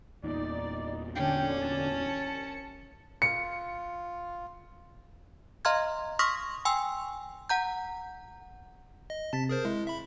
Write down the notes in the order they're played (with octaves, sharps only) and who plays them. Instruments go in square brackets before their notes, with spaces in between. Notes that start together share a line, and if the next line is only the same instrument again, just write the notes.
[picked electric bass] E2 A#2 [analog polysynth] D#4 [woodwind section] D5
[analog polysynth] D3 D4 [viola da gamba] C#4 [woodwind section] G5
[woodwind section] C2 A5
[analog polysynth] C#7
[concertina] F4 [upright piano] C#7
[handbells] D#5 F5 A#5 C6 F6 G#6
C6 C#6 D#6 F6 A#6 B6
G5 G#5 C6 E6
F#5 A#5 G6
[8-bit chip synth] D#5
[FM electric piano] C3 [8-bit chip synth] A5 A6 B6
[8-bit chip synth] G#4 A#4 C5
[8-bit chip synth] G#3 [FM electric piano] E4
[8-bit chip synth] E5 B5